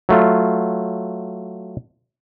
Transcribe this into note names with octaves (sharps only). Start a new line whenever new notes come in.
F#3 A3 F4